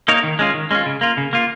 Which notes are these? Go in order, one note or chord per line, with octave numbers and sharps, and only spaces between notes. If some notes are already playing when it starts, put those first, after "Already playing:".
A#3 D#4 A#4 C#5
D#3
G#3 C#4 F4
D#3
G#3 C#4 F4
C#3
A#3 F4
C#3
A#3 F4